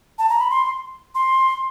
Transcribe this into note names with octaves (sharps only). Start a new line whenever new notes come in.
A5
A#5
B5
C6
C6